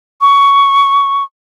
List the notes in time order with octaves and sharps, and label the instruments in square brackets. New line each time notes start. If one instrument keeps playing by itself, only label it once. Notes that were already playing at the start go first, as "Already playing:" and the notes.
[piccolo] C#6